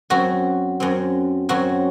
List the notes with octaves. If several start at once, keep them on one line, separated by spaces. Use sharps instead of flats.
F#2 F#3 C4 F#4
F#2 F#3 C4
F#2 F#3 C4 F#4